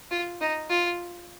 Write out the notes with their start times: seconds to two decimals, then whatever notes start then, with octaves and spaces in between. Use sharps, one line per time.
0.11 F4
0.41 D#4
0.70 F4